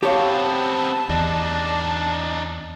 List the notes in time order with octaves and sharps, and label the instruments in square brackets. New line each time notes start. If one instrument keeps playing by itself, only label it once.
[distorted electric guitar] B3 C4 [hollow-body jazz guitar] G4 C#5 F5 [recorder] A5
[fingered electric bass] E2 [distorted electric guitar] D4 D#4